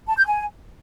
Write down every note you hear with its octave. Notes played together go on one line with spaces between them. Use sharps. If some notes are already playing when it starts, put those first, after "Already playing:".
A5
G6
G#5